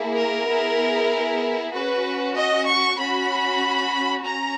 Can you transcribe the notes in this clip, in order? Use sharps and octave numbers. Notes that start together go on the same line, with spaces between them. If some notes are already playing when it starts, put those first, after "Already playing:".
Already playing: A#3 E4 G#4
A#4
B3 E4 G#4
C#4 F#4 B4
D#5
C#6
C#4 F#4 B5
C#4 A#5